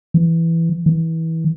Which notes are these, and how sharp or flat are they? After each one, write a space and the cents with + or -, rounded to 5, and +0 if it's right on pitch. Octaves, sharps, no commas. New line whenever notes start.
E3 +5
E3 -25